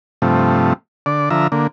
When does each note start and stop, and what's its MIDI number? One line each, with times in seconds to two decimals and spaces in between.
0.22 0.73 43
0.22 0.73 48
0.22 0.73 53
0.22 0.73 57
1.06 1.29 50
1.06 1.29 74
1.31 1.47 50
1.31 1.47 53
1.31 1.47 76
1.31 1.47 82
1.52 1.67 50
1.52 1.67 58